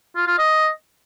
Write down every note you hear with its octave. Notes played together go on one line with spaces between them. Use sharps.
F4
F4
D#5